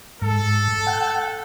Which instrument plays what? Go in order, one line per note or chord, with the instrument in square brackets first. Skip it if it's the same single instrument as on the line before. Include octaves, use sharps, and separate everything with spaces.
[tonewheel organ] G#2 [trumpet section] A4
[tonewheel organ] F#5 G5